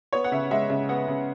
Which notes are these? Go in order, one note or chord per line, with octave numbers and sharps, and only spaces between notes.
B3 C#5
F#5
C#3 E5
G#3 E5
C#3 E5
B3 F#5
C#3